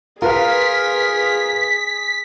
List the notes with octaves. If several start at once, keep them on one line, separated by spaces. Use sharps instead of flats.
F4 G#4 A#4 B4 F5 B6